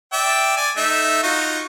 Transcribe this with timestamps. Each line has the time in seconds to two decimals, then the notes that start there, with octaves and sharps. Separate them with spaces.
0.13 D5 E5 G5
0.57 D5 G#5
0.77 A3 D#4 E5
1.23 D#4 F4 F#4